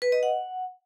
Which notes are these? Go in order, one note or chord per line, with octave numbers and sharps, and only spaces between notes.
B4
D#5
F#5